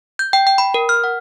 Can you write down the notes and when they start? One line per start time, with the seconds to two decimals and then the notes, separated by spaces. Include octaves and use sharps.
0.19 G6
0.33 G5
0.47 G5
0.58 B5
0.74 A#4
0.89 F6
1.04 F#5